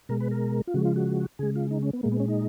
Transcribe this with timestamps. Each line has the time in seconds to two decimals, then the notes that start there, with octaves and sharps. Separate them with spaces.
0.09 B2 G#3 A#4
0.20 B4
0.31 A#4
0.67 F4
0.74 C#3 F3 G#3 F#4
0.85 F4
0.96 F#4
1.39 C#3 G#3 G#4
1.56 F4
1.71 D#4
1.82 C#4
1.93 B3
2.03 A#2 G#3 A#3
2.12 B3
2.20 C#4
2.28 D#4